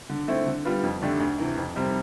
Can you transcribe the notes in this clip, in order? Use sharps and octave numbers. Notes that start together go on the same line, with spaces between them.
D3
A3 C4 E4
D3
G3 B3 F4 B4
F2
D3 A3 D4 G4
D2
C3 E3
F2
C3 G3 C4